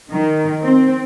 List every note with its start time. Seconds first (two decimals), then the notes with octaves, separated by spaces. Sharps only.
0.11 D#3
0.62 C4